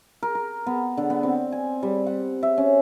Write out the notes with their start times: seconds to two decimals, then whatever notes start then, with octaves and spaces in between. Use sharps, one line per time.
0.23 A#4
0.35 A#4
0.67 B3
0.97 D3
1.10 B3
1.23 C4
1.52 G#5
1.83 G3
2.06 F#5
2.43 E5
2.58 C#4